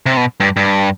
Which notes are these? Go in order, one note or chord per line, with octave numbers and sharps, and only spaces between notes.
C3
B2
G2
G2